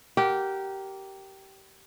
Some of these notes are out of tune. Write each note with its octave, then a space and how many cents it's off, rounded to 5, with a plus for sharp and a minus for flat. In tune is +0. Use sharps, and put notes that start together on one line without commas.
G4 -15 A#4 +0 F#5 +0